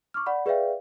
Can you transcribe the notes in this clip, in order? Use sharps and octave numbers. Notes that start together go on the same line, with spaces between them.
C#6 D6 F6
D5 F#5 B5
G#4 B4 D5 E5 F5 G5